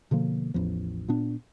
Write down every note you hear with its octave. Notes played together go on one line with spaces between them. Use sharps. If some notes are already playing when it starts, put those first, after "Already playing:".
B2 D3 F3 A#3
A1 E2 F3
A#2 B3 D4